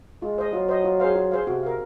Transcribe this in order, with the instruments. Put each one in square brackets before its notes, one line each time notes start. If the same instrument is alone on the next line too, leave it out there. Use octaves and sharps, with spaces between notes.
[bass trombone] G#3 [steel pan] F4
[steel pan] C5 D#5
[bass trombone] F#3 [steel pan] F4
[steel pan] C5 D#5
F4
G#4 C5 F5
F4
G#4 C5 F5
[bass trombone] C3 [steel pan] F#4
[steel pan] A#4 F5